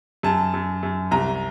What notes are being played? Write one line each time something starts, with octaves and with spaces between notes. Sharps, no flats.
F#2 A5
F#2
F#2
C2 A#5